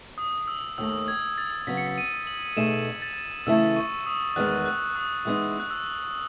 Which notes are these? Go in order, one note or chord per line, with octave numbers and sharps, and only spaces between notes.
D#6
E6
D#2 D#3 A3 E6
G#6
A6
C#3 F#3 B3 B6
C#7
B6
D#7
F#7
B2 A3 D#4 G#4 E7
A6
C#3 E3 A3 E4 A4 E6
C#6
D#6
E2 D#3 G#3 B3 F#6
F#6
D#6
E3 G#3 B3 D#4 D#6
F#6
E6